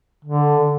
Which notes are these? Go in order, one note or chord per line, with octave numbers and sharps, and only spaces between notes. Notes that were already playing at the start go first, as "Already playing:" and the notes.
D3